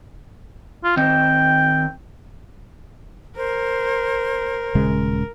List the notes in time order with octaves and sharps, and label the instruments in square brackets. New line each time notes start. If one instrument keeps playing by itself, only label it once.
[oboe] F4
[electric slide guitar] D#3 C4 D#5 [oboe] G5
[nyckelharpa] A#4 [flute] C5
[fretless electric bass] D#1 C#3 G#3